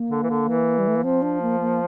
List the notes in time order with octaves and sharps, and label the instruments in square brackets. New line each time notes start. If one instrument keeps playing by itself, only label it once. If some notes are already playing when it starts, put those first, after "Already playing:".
Already playing: [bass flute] A#3
[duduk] D3
E3
D3
E3
[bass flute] G3
A3
A#3
[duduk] F3 [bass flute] C4
[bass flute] D4
A#3
A#3